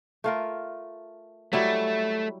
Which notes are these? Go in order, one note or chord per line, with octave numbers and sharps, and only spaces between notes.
A3 F4 A#4
F#3 G3 A3 E4